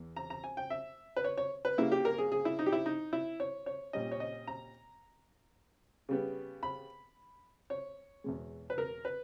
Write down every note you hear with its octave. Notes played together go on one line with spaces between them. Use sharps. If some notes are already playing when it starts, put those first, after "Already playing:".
Already playing: E2 E3
A#5
A#5
G#5
G5
E5
B4
C#5
C#5
B4
C#3 G3 A#3 E4
G4
A#4
G#4
G#4
E4
D#4
G4
E4
D#4
E4
C#5
C#5
A#2 G3 C#4 D#5
C#5
D#5
A#5
C#3 G3 B3
B5
C#5
E2 B2 G#3
B4
A#4
B4